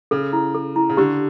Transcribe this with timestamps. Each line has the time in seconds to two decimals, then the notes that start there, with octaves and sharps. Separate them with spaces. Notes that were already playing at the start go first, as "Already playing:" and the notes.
0.11 C#3 A4
0.33 E4
0.55 A4
0.76 E4
0.90 C#3
0.97 D3 G4